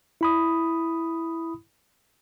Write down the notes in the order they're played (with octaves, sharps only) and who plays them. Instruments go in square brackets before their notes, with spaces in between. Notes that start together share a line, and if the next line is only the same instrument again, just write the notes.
[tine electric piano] E4 B5 D#6